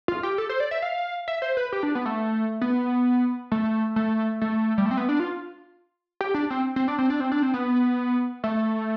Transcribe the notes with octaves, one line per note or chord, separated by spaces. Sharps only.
F4
G4
A4
C5
D5
E5
F5
E5
C5
B4
G4
D4
B3
A3
B3
A3
A3
A3
G3
A3
C4
B3
D4
F4
G4
D4
C4
C4
D4
C4
D4
C4
D4
C4
B3
A3